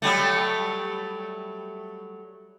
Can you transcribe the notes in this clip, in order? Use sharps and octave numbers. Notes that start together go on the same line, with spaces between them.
F#3 G3 A3